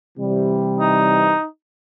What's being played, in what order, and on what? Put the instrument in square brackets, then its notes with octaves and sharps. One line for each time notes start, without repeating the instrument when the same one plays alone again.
[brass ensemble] C3 E3 G3
[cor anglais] D#4